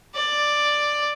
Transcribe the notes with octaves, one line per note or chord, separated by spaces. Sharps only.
D5